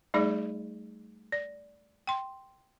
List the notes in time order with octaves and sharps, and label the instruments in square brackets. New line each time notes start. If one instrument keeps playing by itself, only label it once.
[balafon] G3 A3 D#4 G#4 D5
D5
G5 C6